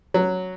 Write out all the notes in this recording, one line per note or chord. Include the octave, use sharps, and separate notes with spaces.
F#3